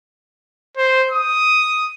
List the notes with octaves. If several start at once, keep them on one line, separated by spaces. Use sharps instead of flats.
C5
D#6